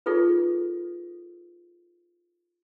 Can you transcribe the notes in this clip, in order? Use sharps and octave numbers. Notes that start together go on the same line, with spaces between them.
D#4 F4 G#4 A4 B4